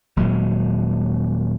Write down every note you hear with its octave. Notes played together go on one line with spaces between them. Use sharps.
D#1 A#2 F#3 G#3